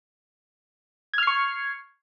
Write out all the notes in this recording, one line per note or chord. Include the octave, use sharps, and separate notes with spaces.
C#6 F6 G#6 C7